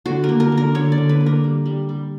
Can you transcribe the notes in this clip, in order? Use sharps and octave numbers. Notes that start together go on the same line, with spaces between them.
D3 F#4
A#4
A#3
A#4
D3
A#4
D3 C#5
D5
D3
B4
A#3
A#4
G3
G3
G3